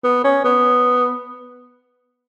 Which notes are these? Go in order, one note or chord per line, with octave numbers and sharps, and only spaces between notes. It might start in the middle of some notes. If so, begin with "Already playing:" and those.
B3
C#4
B3